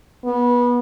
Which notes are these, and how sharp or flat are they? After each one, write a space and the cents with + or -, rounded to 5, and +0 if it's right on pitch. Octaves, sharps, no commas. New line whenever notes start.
B3 -25